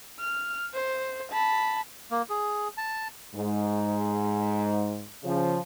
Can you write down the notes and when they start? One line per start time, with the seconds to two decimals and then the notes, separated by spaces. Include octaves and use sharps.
0.20 F6
0.74 C5
1.32 A5 B5
2.11 A#3
2.30 G#4
2.78 A5
3.35 G#2
5.24 C#3 F3